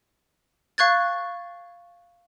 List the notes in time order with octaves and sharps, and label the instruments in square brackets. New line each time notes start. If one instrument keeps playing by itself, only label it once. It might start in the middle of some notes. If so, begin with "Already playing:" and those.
[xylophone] F5 C#6 F#6 G#6 A6